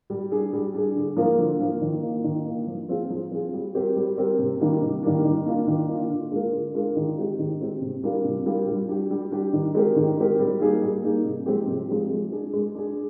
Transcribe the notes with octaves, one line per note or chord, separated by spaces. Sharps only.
G3
D4 G#4
G3
D4 G#4
D3
F3 A#3 F4 A#4
D3
F3 A#3 F4 A#4
D#3
A#3 F4
D#3
A#3 F4
F3
C4 F4 G#4
F3
C4 F4 G#4
G3
C4 G4 A#4
G3
C4 G4 A#4
C3
D#3 G3 A#3 D4
C3
D#3 G3 A#3 D4
D#3
A#3 D4 F4
D#3
A#3 D4 F4
D3
G#3 D4 F4 A#4
D3
G#3 D4 F4 A#4
D#3
G#3 C4 G4
D#3
G#3 C4 G4
C3
G3 D4 F4 A#4
C3
G3 D4 F4 A#4
G3
D4 G4
G3
D4 G4
D#3
G#3 C4 G4 A#4
D#3
G#3 C4 G4 A#4
G3
A#3 D#4 G#4
G3
A#3 D#4 G#4
C3
F3 G#3 C4 G4
C3
F3 G#3 C4 G4
G#3
D4 G#4
G#3
D4 G#4